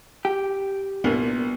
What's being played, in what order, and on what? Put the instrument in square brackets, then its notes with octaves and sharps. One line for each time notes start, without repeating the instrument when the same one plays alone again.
[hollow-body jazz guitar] G4
[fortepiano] C2 A#2 [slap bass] B3